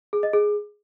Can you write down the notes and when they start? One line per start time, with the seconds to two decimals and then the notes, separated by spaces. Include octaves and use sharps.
0.13 G#4
0.23 D#5
0.33 G#4